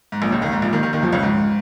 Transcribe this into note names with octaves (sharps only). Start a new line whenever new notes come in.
G#2
A#1 A#2
C#2 C#3
D#2 D#3
G#2
A#1 A#2
D#2 D#3
D#2 D#3
D#2 D#3
F2 F3
C#2 C#3
G#2